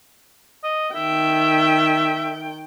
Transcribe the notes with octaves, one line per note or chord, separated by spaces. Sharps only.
D#5
D#3 E5 G5